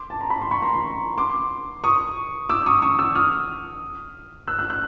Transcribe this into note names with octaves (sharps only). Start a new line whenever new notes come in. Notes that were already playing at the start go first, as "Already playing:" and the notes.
Already playing: C6 D6
A5
A#5
B5
C6
B5 C#6
A#5 C6
A#5 C6
C6 D6
C#6 D#6
D6 E6
C#6 D#6
C#6 D#6
D6 E6
D#6 F6
E6 F#6
E6 F#6
E6 F#6